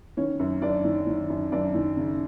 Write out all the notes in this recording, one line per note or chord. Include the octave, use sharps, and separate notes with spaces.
D#3 C#4 C#5
F#2
F#2 D4 D5
D#3
D#3
F#2
F#2 D4 D5
D#3
C#3